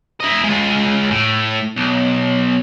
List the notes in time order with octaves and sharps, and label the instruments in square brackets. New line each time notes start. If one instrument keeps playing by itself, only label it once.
[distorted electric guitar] E4 D#5
G#3 F4
A2
B1